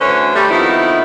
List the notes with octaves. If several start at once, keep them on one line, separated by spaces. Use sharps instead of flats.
D2 D3 E3 C#4 C5 C#5
G3 A3
D#3 F3 A3 B3 C4 E4